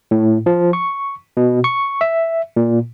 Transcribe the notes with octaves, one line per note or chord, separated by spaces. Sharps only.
A2
F3
C#6
B2
C#6
E5
A#2